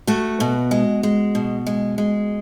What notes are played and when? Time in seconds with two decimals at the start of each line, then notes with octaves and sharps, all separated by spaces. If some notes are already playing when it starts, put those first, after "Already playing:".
0.07 A3 F#4
0.40 B2
0.71 G#3
1.03 G#3
1.35 B2
1.67 G#3
1.98 G#3